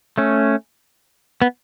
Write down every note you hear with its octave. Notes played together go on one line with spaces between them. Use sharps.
A3 C#4
B3